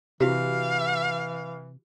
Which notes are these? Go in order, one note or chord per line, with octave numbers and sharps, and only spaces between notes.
C3 E3 E4 F#4 G4 F5